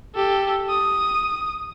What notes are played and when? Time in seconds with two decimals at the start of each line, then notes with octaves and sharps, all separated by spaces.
0.15 G4 A4
0.70 D#6